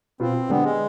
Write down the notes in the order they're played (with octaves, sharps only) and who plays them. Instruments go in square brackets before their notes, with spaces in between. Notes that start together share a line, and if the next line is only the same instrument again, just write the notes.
[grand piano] B2 B3 F4 [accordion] C4
[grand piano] D3 G#3 D4 G4 [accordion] B3
[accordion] G#3